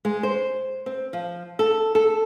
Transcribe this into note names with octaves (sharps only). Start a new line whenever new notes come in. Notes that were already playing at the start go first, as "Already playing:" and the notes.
G#3
C5
C4
F3
A4
A4